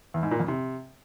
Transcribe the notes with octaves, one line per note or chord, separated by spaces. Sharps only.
E2
G#2
A#2
F2
C3